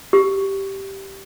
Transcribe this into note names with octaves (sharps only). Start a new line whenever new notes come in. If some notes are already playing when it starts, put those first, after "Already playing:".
G4